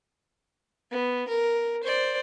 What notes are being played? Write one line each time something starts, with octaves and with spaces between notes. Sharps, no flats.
B3
A#4
C5 D5